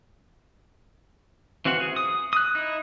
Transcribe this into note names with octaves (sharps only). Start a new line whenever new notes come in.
E3 C4 F#4 F5 F#5
G#4
D#6
D#6 F#6
D#4 E4